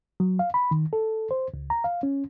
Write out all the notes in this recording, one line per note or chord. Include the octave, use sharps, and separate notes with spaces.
F#3
F5
B5
D#3
A4
C5
C#2
A#5
F5
C#4